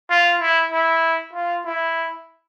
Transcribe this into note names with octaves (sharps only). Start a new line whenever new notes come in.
F4
E4
E4
F4
E4